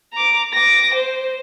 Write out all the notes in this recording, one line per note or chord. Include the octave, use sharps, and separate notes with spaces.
A#5 D6
D6 A#6
C5